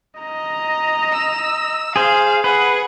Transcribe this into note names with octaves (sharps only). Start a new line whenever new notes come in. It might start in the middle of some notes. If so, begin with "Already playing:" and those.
D#5 A#5
E6
G#4 C5 F5
G#4 B4 F#5